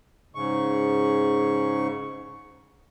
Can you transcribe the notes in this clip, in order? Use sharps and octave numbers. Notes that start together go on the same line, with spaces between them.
G#2 C#3 C#6